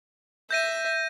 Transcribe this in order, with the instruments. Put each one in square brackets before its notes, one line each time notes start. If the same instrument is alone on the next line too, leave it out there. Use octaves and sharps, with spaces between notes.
[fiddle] E5 [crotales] G6 A#6 D#7